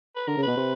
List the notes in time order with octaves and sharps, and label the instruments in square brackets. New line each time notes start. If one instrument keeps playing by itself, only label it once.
[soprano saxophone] B4
[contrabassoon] D3 [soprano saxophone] A#4
[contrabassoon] C#3
[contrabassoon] B2 [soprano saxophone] B4
[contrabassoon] C3